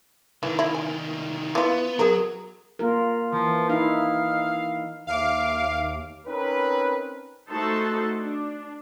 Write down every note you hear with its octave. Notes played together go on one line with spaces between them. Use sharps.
C2 D#3 E3
E4
G#5
E3 B3 F4
F#3 G#4 A#4
A#3 F4 A#4
E3 F3
D#4 E4 F5
D#2 E5 F5 D6
C4 C#4 D#4 A#4 B4
A3 D#4 F#4 A4 C5 A5
D4